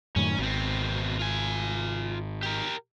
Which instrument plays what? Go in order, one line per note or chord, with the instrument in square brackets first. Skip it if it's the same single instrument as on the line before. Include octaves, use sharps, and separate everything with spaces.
[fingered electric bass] F#2 A2 D#3 [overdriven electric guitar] C#4
[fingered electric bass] G#1 [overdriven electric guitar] B2 C4
[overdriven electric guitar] F4 G#5
G4 A#4